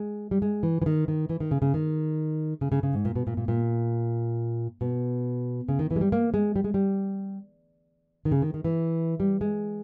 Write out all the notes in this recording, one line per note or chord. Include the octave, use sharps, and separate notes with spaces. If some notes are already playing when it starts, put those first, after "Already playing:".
Already playing: G#3
G3
G#3
E3
E3
D#3
D#3
E3
D#3
C#3
C#3
D#3
C#3
C#3
C#3
G#2
A#2
B2
A#2
A#2
A#2
B2
C#3
D#3
E3
G#3
G3
A#3
G#3
G3
G#3
G3
D#3
C#3
D#3
D#3
E3
G3
G#3